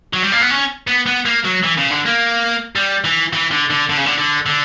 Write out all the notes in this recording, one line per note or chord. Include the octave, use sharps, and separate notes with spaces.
F#3
G3
A#3
B3
C#4
B3
B3
A#3
F#3
E3
C#3
D3
A#3
G3
E3
E3
D3
D3
D3
C#3
D3
D3
D3